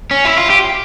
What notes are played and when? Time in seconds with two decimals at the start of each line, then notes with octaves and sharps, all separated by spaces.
0.11 C#4
0.25 E4
0.38 F4
0.50 G4